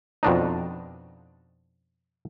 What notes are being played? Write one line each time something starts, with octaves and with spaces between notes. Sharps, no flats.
F2 B2 D4 D#4